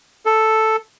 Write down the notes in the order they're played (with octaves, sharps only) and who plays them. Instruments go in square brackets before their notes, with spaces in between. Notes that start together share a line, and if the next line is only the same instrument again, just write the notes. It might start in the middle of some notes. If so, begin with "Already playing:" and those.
[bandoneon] A4